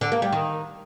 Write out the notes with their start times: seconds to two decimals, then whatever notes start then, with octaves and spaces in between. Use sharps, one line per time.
0.01 D3
0.12 A#3
0.22 G3
0.33 D#3